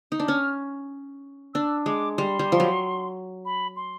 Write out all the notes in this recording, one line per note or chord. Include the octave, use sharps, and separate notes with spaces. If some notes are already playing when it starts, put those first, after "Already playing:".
D#4
D4
C#4 F6
D4 E6
G#3 D6
G3 C6
G3
F3
F#3
B5
C6